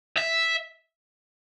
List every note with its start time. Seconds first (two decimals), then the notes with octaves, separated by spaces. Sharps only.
0.18 E5